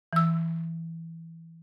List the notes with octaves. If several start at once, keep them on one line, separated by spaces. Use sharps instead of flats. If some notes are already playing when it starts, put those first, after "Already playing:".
E3 E6